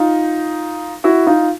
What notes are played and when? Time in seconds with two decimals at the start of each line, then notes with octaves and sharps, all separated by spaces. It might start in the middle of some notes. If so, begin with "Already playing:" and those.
Already playing: D#4 F4
1.04 E4 F#4
1.27 D#4 F4